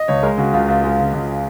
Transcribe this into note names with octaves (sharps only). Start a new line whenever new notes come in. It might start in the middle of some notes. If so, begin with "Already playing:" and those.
Already playing: D#5
C#2 C#5
G#3 A#4
C#3 F#4
C#2 F4
C#2
G#3
C#3
C#2